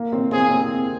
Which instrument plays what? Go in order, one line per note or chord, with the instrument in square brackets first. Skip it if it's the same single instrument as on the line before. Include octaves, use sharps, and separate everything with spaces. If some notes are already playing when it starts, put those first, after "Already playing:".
Already playing: [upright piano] A#3
C4
[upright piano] C4 [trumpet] G#4
[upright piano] A#3
C4